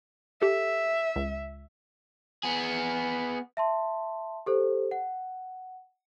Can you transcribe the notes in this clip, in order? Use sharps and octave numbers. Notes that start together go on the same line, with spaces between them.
G4 A4 E5
C#2
B3 G#4
E5 A5 C6
G4 A4 C5
F#5